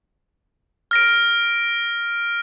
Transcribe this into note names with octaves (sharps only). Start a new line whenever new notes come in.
F6 A#6 D7